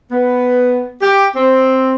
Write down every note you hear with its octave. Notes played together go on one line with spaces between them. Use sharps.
B3
G4
C4